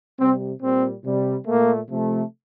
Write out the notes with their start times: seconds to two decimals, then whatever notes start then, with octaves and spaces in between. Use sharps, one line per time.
0.19 C3 G3 C4
0.61 A#2 G3 C4
1.04 C3 G3
1.46 A#2 A3 A#3
1.89 C3 F3 A3